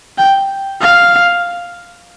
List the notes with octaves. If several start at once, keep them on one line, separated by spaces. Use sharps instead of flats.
G5
F5